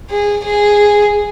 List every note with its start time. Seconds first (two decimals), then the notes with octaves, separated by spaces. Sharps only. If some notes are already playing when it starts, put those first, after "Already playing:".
0.10 G#4
0.44 G#4